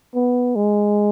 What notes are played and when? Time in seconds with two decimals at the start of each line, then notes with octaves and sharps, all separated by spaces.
0.15 B3
0.56 G#3